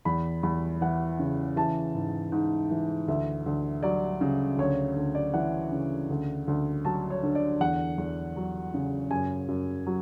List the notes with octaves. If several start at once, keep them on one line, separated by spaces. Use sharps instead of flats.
E2 B5
E2 B5
E3 F#5
C#3
E3 A5
G#2
G#2
E3
D2 E5
D2
F#3 D5
C#3
D2 C#5
D2
D5
E3 F#5
C#3
D2
D2
F#3 A5
C#5
D3
D5
E2 F#5
E2
F#3
C#3
F#2 G#5
F#2
F#3